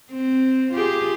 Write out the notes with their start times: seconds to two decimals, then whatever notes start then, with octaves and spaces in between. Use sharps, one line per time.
0.12 C4
0.72 F4 G4 G#4